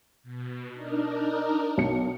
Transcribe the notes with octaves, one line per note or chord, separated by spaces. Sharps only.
B2
D4 D#4 A#4
B1 C#7